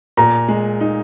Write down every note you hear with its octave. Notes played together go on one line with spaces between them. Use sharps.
A#2 A#5
G#3
D#4